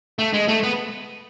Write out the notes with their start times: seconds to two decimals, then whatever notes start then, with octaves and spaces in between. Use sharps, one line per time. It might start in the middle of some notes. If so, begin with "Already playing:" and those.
0.19 A3
0.34 G#3
0.48 A3
0.63 B3